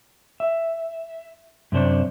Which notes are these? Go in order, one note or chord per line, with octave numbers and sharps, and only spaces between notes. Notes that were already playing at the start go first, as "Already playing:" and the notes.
E5
F#2 C3 D4 C5 C#5